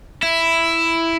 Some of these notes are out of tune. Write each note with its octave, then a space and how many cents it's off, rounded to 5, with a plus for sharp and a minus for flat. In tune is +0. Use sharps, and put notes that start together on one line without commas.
E4 +5